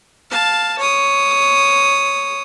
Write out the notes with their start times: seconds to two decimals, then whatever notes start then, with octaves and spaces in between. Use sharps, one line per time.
0.30 F5 A5
0.78 C#5 D#6